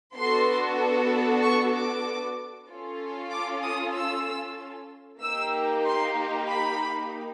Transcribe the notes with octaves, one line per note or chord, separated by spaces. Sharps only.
B3 D4 F#4 A4 C6
C#6
D6
C#4 F4 A4
D6
D#6
E6
A#3 D#4 G4 E6
C6
B5